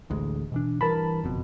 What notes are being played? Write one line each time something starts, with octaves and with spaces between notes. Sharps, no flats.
A1 D2 G#3
B2 E3 D4
G2 E3 A#4 A5 B5
F#1 F2 B2